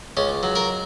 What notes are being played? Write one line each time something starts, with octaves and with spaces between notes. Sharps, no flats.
C#2 C#4
F#3
A#4